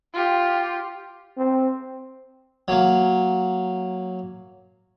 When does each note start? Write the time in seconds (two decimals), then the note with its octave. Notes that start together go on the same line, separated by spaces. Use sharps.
0.13 F4 G4
1.37 C4
2.68 F#3 A#3